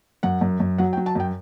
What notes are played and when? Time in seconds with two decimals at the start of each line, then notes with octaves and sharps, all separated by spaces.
0.23 F#2 F#5
0.41 F#2
0.60 F#2
0.78 F#3 F#5
0.93 G5
0.97 F#3
1.06 A5
1.15 F#2 G5